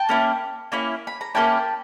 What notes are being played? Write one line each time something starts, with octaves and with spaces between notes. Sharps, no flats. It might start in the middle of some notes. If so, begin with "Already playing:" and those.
Already playing: G5 A5
A#3 C#4 E4
A#3 C#4 E4
B5
A#5
A#3 C#4 E4 G5 A5